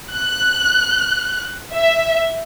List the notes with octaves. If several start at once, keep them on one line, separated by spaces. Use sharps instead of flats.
F#6
E5